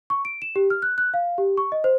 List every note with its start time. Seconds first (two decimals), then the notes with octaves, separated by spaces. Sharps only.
0.10 C#6
0.25 D7
0.42 E7
0.56 G4
0.70 F6
0.82 F#6
0.98 F#6
1.14 F5
1.38 G4
1.57 C#6
1.72 D#5
1.84 C5